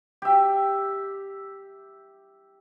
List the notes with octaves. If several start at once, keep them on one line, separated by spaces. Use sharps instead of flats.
G4 E5